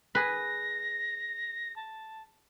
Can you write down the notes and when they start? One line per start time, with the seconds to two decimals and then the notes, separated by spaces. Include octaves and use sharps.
0.15 G#4 B4 A#6
1.76 A5